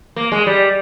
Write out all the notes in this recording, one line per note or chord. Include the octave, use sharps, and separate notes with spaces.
A#3
G#3
G3